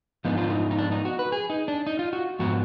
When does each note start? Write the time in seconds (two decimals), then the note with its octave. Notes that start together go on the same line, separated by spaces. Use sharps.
0.25 G#2 F3 B3 D4 D#4
0.37 F4
0.50 D#4
0.71 D#4
0.79 D4
0.92 D#4
1.05 F#4
1.19 B4
1.32 G#4
1.50 D#4
1.68 D4
1.87 D#4
1.99 F4
2.13 F#4
2.39 G#2 F3 B3 F#4